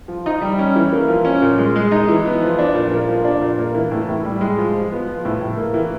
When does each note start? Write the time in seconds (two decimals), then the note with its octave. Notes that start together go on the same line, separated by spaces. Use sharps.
0.08 F3
0.26 D#4
0.41 G3
0.59 C#4
0.76 E3
0.92 A#3
1.08 F3
1.25 C#4
1.42 A#2
1.58 G#3
1.76 G#3
1.92 D#4
2.09 E3
2.25 B3
2.42 F3
2.58 D4
2.75 A#2
2.91 A#3
3.09 F3
3.24 D4
3.41 A#2
3.59 A#3
3.75 E3
3.91 A2
4.08 A2
4.25 G3
4.41 G#3
4.58 F3
4.75 F3
4.91 B3
5.08 F3
5.25 A2
5.41 A2
5.57 A#3
5.74 E3